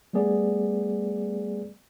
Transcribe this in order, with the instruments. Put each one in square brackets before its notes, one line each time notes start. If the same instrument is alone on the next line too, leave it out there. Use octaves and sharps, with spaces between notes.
[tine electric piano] G3 A3 B3 G#4 D5